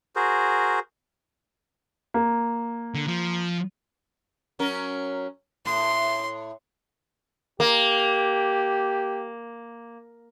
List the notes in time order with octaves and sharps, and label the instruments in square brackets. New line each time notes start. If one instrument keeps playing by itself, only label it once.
[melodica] F#4 G#4 A#4 C5
[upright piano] A#3
[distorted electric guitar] D3
F3
[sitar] F#3 C#4 A#4
[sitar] A2 [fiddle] C6
[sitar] A#3 [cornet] G4